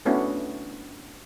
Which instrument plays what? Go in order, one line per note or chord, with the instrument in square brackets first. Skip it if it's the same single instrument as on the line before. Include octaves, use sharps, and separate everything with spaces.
[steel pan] A3 B3 C#4 D4 E4 F#4